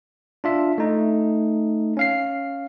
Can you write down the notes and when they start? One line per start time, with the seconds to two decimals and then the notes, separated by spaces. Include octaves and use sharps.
0.44 D4 F4 E5
0.78 A3 D#4
1.97 C#4 F5 C7